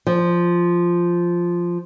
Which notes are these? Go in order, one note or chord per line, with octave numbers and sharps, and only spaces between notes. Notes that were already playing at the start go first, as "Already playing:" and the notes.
F3